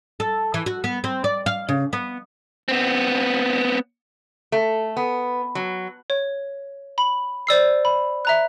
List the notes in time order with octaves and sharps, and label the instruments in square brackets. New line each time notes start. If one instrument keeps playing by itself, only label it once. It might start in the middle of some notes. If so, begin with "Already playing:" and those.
[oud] A4
E3
F#4
B3
C4
D5
F5
C#3
B3
[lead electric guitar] B3 C4
[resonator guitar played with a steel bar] A3
B3
F#3
[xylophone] C#5
B5 F#7
C5 D5 E6 C7
B5
E5 A#5 F#6